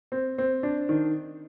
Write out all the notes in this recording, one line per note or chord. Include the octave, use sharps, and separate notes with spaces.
C4
C4
D4
D#3